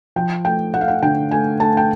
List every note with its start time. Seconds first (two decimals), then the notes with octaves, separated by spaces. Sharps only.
0.16 F3 G5
0.45 A3 G5
0.74 A3 F#5
0.81 F5
0.88 F#5
1.02 D3 G5
1.31 A3 G#5
1.60 A3 A5
1.77 G5